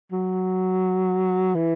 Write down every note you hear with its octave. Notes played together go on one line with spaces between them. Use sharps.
F#3
E3